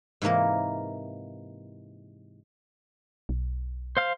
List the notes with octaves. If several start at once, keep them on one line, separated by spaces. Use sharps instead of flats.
G#2 C3 E3 A#3 A#4
B1
C5 F5 F6